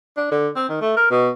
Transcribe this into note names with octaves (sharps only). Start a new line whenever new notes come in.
D4
D3
C4
D#3
A3
A#4
B2